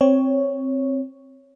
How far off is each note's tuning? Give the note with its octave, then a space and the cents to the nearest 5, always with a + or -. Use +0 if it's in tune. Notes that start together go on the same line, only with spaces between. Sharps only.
C4 +10 C#5 +0